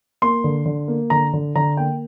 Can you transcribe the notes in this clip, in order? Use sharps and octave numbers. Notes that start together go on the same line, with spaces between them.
A#3 C6
D3
D3
A#3
D3 A#5
D3
D3 A#5
A#3 G5